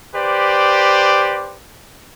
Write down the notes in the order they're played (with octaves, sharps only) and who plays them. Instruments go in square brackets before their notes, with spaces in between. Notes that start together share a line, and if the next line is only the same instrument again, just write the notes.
[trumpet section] G4 B4 C5 D5